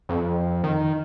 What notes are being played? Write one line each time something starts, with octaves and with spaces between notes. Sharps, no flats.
F2
D#3